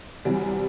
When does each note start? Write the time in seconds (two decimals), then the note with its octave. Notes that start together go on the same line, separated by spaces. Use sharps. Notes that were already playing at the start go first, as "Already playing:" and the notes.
0.25 E2 C3 F#3 G3